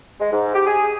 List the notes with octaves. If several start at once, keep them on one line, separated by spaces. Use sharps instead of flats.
G#3
G#2
G4
G#4